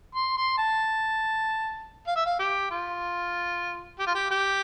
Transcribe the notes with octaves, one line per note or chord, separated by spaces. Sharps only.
C6
C6
A5
F5
E5
F5
G4
F4
G4
F4
G4
G4